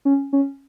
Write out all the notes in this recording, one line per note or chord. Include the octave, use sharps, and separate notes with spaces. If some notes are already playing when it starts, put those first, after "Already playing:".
C#4
C#4